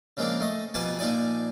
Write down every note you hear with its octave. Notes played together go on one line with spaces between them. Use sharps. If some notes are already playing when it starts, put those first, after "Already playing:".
C#3 F3 G#3 A#3 C4 D4
A3 D#5
F2 B2 G4 B4 G#5 A5
A#1 F3 D#4 D5 G#5